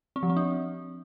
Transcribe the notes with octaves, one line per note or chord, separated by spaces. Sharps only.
C4
F3
C4
D4